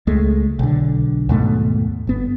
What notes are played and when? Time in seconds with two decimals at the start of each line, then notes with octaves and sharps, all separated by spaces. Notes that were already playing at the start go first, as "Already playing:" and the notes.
0.07 C#2 G#3 A3
0.59 B1 D3
1.29 D#2 G#2 B2 A3
2.07 G1 B3